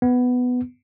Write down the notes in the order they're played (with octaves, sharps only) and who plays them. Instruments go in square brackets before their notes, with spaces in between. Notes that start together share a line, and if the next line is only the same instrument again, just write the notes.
[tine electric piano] B3